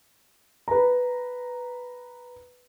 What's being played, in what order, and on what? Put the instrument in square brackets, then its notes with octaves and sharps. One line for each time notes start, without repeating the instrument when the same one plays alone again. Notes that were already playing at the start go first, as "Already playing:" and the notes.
[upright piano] B4 A#5